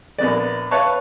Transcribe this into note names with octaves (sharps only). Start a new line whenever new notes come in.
A#1 B3 D5
B4 C#5 E5 F5 A5 C#6